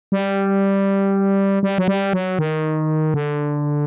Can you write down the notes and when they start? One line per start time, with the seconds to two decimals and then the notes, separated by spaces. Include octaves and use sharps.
0.12 G3
1.63 G3
1.78 F#3
1.88 G3
2.13 F#3
2.39 D#3
3.14 D3